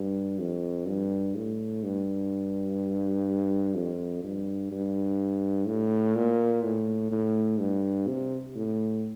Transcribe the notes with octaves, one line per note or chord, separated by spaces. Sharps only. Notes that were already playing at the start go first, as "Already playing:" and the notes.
Already playing: G2
F2
G2
A2
G2
F2
G2
G2
A2
A#2
A2
A2
G2
C3
A2